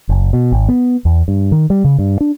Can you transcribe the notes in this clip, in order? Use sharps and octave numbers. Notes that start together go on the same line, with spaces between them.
F#1
B2
G#1
B3
E2
G2
D#3
G3
C#3
G2
D4